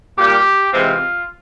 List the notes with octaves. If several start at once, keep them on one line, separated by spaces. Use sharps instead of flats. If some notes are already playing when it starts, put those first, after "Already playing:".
A#2 G3 A#3 G4
C3 E3 G#3 C4 F4